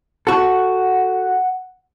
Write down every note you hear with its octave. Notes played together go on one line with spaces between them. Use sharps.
F#4 A4 F#5